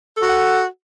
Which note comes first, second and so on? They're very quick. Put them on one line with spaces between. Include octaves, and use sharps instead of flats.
A4 F#4 F#5